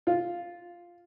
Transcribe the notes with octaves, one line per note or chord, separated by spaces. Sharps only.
F4